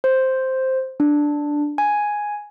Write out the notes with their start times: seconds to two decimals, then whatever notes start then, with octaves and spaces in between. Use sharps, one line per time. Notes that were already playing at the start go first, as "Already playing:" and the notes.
0.04 C5
1.00 D4
1.78 G#5